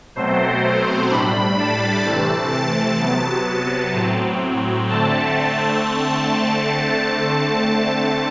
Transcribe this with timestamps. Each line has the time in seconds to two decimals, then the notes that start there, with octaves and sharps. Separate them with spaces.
0.16 B2 F#3 A3 C4 C5
1.10 A2 G3 D4 B5
1.58 A5
2.05 C3 E3 A3 C4
2.52 A5
2.99 C3 F#3 B3
3.93 A2 F#3 C4
4.88 D3 A3 C4 A5